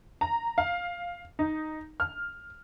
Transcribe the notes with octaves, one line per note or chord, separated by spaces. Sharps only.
A#5
F5
D#4
F6